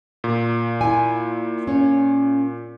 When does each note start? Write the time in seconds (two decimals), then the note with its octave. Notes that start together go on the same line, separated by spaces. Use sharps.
0.24 A#2
0.81 E4 G#5
1.68 C#4 C#5